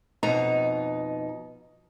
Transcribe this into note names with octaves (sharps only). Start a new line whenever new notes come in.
F2 B2 D#4 A#5